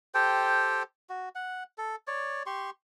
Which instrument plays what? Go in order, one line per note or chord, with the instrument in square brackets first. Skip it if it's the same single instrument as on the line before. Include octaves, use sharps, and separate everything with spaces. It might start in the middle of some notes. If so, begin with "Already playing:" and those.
[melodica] G4 A4 C5 G5
F#4
F#5
A4
C#5 D5
G4 C6 C#6